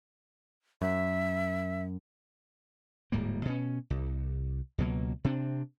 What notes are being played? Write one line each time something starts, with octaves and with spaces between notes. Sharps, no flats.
F#2 E5
D1 G#2 G3 A#3
B2 C#4
C2
C#2 B2 F#3 A#3
C3 C4 D4